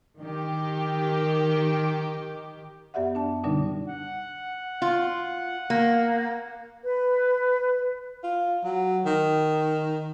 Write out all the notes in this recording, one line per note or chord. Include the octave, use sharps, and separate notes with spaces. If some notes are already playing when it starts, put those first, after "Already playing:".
D#3 G4
F#2 B3 G4 D5 E5 F#5
D4 A5
B2 D3 G3 D4 D#4
F#5
F4
A#3
B4
F4
F#3
D#3